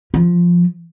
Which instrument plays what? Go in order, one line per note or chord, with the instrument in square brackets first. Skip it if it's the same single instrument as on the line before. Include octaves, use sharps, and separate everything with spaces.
[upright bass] F3